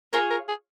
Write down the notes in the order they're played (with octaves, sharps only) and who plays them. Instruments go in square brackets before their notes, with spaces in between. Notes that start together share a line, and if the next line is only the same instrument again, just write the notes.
[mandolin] F4 G#4 C#5 [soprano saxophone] A#4
[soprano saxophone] A#4
G#4